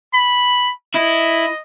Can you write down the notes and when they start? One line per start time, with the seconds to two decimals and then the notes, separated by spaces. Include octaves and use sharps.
0.14 B5
0.95 E4 D#5